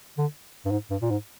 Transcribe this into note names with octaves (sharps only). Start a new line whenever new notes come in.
D3
G2
G#2
G2
A#2
G#2